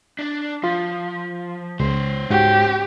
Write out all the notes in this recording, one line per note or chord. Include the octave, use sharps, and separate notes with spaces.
D4 D5
F3 F4
C#2 C#4 C5
G#2 F#4 G4 F#5